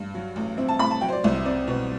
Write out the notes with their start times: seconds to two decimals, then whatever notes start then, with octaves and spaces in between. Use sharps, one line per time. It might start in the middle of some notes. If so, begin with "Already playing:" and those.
Already playing: G2
0.14 F#3
0.36 A1
0.57 C4 E5
0.68 A5
0.79 A2 B5
0.91 A5
1.01 F#3 G5
1.08 C5
1.12 D5
1.24 C2 E5
1.35 E5
1.45 C4 D5
1.67 B2